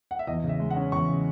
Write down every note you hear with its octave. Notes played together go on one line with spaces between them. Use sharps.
F#5
E5
E2 D#5
C#3
E5
G#3
F#5
C#4
E2 C#6
C#3